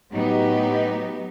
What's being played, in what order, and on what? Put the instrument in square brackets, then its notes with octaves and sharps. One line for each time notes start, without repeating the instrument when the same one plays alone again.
[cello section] A2 F#3 B3 D#4 G4